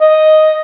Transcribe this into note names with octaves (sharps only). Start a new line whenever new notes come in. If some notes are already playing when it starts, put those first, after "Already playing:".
D#5